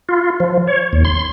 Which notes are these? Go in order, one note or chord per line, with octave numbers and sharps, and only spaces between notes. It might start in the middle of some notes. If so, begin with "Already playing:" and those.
F4
F3
C#5
D#2
C6